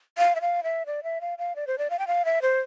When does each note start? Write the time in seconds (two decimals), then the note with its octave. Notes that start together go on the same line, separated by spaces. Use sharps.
0.18 F5
0.35 E5
0.41 F5
0.63 E5
0.86 D5
1.03 E5
1.21 F5
1.38 F5
1.56 D5
1.67 C5
1.78 D5
1.90 F5
1.99 G5
2.07 F5
2.25 E5
2.42 C5